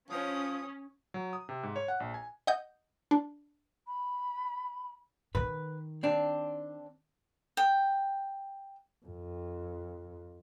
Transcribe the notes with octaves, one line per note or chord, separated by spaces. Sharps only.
F3 C#4 D#6
F#3
D#6
C3
G#2
C#5
F#5
A#1
G#5
D#5 F#5 D#6 G6
D4
B5
D#3 B4
C4 D4
G5
F2